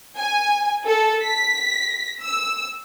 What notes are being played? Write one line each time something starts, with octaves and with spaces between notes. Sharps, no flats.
G#5
A4
B6
E6